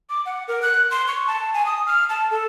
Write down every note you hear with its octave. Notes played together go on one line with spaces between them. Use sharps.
D6
F#5
A#4
F#6
C6
C#6
A5
G#5
D#6
F6
A5
A4